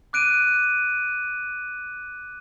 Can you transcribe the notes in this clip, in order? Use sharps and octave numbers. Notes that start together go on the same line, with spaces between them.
D6 F#6 D7 D#7